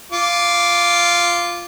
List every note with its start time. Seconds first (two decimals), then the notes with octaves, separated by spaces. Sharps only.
0.12 F4 D6